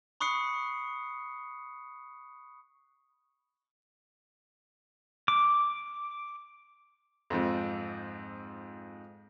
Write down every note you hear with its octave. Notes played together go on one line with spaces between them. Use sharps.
B5 C#6 D#6 F#6 C7 C#7
D6
F2 G#2 F3 C4